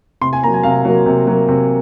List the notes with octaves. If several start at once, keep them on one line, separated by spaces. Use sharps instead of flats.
C3 C6
G#5
F#3 A#3 A#5
G#5
C3 F5
F#3 A#3
C3
F#3 A#3
C3